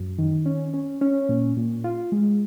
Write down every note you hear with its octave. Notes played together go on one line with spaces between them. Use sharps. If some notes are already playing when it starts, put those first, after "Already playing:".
Already playing: F#2
D#3
C#4
C#4
C#4
A#2
A#2
F4
G#3